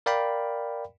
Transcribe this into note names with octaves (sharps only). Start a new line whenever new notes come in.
A#4 D5 F5 G5 B5